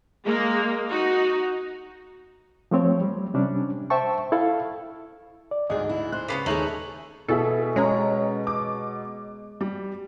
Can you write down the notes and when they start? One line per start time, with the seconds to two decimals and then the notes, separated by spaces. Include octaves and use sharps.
0.24 G#3 A#3
0.89 D#4 F#4
2.71 F3 A3 C4 C#5
3.01 G3
3.34 C3 G3 C#4 D4
3.90 C5 E5 G5 A5 C#6
4.32 E4 A4 F5
5.51 D5
5.70 D2 G#2 D4 G#4 D#5
5.89 E4
6.12 C5 F#6
6.28 C#3 A#3 B3 C#4 B6 C7
6.46 D#2 D#4 G#4 A4 C#5 E5 F#7
7.28 B2 E4 G#4 A4 E5
7.76 G#3 C#4 C#5 A#5
8.47 D6
9.61 G3